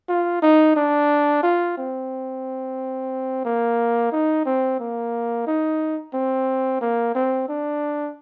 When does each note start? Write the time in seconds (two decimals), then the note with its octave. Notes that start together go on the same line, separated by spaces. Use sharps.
0.09 F4
0.42 D#4
0.76 D4
1.43 F4
1.77 C4
3.45 A#3
4.12 D#4
4.46 C4
4.79 A#3
5.47 D#4
6.14 C4
6.81 A#3
7.15 C4
7.48 D4